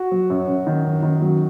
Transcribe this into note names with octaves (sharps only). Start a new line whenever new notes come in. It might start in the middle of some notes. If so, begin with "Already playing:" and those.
Already playing: F#4
F#3
F#2
F#2
D#3
F#2
D#3
F#3